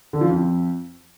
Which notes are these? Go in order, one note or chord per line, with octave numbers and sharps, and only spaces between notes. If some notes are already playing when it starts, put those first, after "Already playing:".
D3
F3
F2